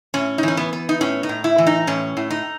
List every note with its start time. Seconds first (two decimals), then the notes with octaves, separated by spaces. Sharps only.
0.14 A2 C#4
0.38 D#4
0.43 E3 C#4
0.57 B3
0.73 B3
0.89 D#4
1.01 A2 C#4
1.23 D#4
1.29 A2
1.44 E4
1.58 E3
1.67 D#4
1.87 A2 C#4
2.17 A2
2.30 D#4